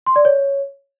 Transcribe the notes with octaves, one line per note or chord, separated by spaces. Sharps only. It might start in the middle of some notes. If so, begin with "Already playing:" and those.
C6
D5
C#5